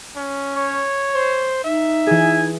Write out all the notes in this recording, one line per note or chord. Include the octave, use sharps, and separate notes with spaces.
C#4
C#5
C5
D#4 E5
E3 G#4 G#5